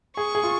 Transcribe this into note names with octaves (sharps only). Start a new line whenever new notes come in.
G#4 C#6
G#4
F4